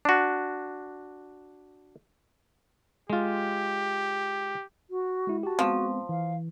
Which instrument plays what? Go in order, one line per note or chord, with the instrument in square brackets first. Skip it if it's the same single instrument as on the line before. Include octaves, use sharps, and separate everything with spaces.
[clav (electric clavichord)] D4 F#4
[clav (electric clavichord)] G#3 F4 [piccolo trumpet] G4
[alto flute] F#4
[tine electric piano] G#3 E4
[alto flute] F#4 [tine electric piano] G4 A5
[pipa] F3 [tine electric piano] G#3 B3 C4
[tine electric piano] E3 [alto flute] F5